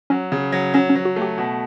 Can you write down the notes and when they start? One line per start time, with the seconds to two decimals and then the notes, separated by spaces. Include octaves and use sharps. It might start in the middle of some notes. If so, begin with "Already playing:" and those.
0.10 F#3 C#4
0.32 C#3
0.52 F#3
0.74 F#3 C#4
0.90 C#4
0.95 F#3
1.05 F#4
1.16 A3
1.22 G4
1.38 B2